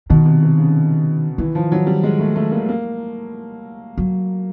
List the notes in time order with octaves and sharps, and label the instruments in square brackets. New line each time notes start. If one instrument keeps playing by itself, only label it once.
[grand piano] B2 [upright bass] D#3
[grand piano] C3
C3
C#3
[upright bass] D#3 [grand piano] E3
[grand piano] F3
F#3
G3
G#3
A3
A3
A#3
A#3
[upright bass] F#3